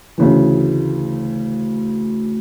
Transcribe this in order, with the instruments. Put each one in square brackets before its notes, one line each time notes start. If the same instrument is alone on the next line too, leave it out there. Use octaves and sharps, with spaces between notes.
[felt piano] D2 C#3 E3